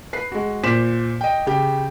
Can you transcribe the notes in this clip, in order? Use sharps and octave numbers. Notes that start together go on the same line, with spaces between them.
B4 C7
G#3 F#4
A#2 C5 D6 B6 E7
D#5 G5
C#3 G4